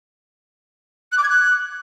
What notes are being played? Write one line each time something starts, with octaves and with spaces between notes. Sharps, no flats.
F#6
D6
G#6
F#6